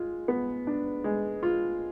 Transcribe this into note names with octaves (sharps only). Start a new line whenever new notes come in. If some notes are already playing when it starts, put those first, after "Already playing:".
Already playing: G#3 F4
B3
D4
G#3
F4